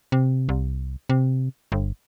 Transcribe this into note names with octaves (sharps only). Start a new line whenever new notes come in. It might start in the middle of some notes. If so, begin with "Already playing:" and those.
C3
C2
C3
G1